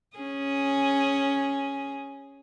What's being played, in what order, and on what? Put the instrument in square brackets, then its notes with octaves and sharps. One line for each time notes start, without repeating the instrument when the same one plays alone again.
[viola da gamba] C#4 G#4